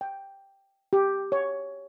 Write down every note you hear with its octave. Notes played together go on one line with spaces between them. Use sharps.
G5
G4
C#5